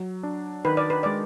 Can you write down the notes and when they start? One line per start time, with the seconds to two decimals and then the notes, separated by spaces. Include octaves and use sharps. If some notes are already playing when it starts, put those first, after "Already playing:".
Already playing: F#3
0.23 D4
0.65 D#3 B4
0.77 D5
0.90 B4
1.03 G#3 D5